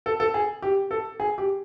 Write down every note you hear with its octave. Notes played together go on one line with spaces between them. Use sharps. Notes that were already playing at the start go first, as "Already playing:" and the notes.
A4
A4
G#4
G4
A4
G#4
G4